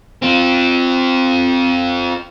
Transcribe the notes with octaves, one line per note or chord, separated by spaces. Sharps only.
C4 F4